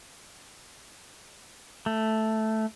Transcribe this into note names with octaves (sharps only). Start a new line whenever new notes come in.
A3